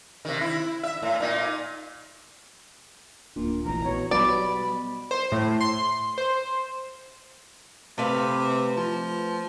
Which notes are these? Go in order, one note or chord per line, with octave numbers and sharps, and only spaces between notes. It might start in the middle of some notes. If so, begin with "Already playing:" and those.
C3 D#3
E4
E5
A2
A#2 D#4
D1 A#2 D4
F1 A#1 E3 A#5
B2 C#5
B2 F#3 G3 D5 B5
C5
A2
C6
C5
C3 A3 B4 F5
F3